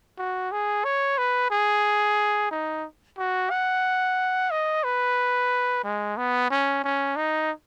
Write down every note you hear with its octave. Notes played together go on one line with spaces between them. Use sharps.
F#4
G#4
C#5
B4
G#4
D#4
F#4
F#5
D#5
B4
G#3
B3
C#4
C#4
D#4